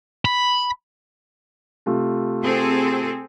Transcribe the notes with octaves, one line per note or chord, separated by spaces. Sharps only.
B5
C3 A3 F4
C4 G#4 A4